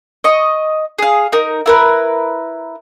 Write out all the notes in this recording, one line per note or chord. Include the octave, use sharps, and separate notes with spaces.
D#5 C#6
G#4 F5
D#4 A#4
E4 A#4 B4